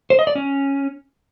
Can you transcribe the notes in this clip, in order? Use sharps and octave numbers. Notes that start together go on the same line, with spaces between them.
C5
D#5
D5
C#4